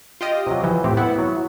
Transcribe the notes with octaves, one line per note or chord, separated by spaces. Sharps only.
F4 G4 D#5
C3 F#3
E3 F3
A2 C4 G4
B3 E4 F#5
F#3